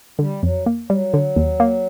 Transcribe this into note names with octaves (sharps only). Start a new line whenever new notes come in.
D3 G3
F2 F#3
A#3
F#3 G3
D3
D#2
A#3